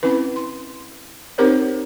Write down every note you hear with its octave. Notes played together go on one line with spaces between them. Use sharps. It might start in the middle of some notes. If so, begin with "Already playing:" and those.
C4 C#4 E4 B4
C6
C4 D#4 G4 A#4 C5 C#5